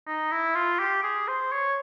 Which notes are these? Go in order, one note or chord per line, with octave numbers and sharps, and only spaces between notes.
D#4
E4
F4
G4
G#4
C5
C#5